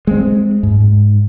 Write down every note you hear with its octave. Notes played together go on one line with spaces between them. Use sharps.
G#3 A3 C4
G#2